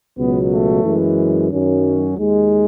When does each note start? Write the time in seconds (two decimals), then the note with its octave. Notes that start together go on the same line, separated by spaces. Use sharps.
0.17 C#2 B2 F#3 B3
0.52 A3
0.84 F#2 E3 G#3
1.51 F#2 D#3 F#3 C#4
2.17 D#2 D#3 G#3